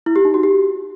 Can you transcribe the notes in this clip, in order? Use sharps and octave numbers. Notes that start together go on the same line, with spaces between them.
E4
G4
D#4
F#4
G4